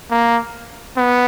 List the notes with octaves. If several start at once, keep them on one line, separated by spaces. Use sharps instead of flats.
A#3
B3